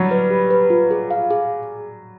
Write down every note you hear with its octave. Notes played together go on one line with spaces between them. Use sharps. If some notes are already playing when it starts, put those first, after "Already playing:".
Already playing: F#3 G3
B4
G4
B4
F4
G#4
F5
G#4